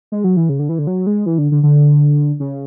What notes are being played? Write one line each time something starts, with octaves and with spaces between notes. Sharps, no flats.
G#3
F#3
E3
C#3
D3
E3
D3
F#3
G#3
E3
D3
D3
D3
C#3